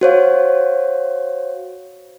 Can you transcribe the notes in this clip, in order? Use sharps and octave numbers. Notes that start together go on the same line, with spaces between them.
F#4 C5 C#5 F5